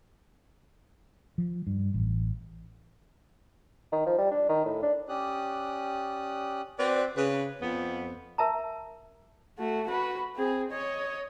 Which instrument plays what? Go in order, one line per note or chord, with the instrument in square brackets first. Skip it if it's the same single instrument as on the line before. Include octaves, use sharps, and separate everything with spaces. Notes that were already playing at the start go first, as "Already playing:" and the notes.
[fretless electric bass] F3
G2
A1
[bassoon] D#3
F3
G3
D4
D#3
A2
D4
[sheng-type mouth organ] C#4 G4 D5 D#6 F#6
[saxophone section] C4 F#4 B4 D5
C#3 B4
F2 B3
[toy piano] A#4 E5 A5 A#5
[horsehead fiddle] A3 F#4
F#4 B4
C4 G#4
C#5 D#5